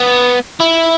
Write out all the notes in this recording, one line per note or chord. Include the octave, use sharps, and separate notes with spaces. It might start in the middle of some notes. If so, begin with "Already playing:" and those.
Already playing: B3
E4